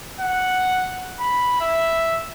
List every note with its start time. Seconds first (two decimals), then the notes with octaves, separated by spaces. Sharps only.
0.20 F#5
1.20 B5
1.61 E5